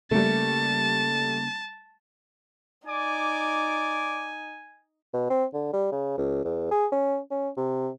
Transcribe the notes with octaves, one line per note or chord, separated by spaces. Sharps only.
C#3 G3 A3 A#3 A5
D#4 D5 G#5 D6
B2
C4
D3
G3
C#3
C#2
E2
G#4
C#4
C#4
C3